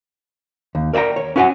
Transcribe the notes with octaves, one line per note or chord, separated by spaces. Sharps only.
D#2
A#4 D5 E5 G5 A#5
C#5
C#4 E4 F#4 C#5 F#5 G#5